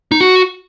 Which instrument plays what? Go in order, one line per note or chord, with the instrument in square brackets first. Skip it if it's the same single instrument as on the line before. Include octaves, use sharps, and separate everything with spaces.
[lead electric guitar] D#4
F#4